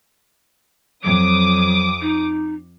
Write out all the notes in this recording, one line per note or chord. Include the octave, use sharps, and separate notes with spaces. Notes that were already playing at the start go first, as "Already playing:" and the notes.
F2 F#3 D6 D#6
D#4